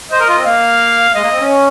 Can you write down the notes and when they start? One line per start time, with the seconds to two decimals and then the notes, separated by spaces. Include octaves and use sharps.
0.11 C5 D#5
0.20 A#4
0.29 F4
0.37 C4
0.45 A#3 F5
1.15 G#3 D#5
1.22 A#3
1.31 C4
1.41 C#4